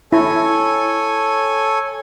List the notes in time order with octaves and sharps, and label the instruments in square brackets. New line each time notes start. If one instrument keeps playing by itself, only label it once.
[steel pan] E4 [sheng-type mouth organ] A4 C#5 G#5